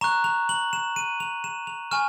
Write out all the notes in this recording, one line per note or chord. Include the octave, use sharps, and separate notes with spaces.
A#5 C#6 F#6 E7
F7
F#7
E7
D#7
F7
E7
F7
G#5 C#6 F6 E7